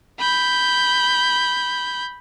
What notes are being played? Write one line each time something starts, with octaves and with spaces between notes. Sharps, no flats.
B5 G6